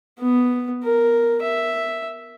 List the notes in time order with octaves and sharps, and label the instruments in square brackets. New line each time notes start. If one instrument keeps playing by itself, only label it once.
[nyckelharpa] B3
A#4
E5